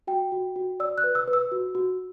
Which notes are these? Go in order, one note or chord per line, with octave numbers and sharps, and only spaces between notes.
F#4 G5
F#4
F#4
D5 E6
F#6
B4
E6
B4
E6
F#4
F#4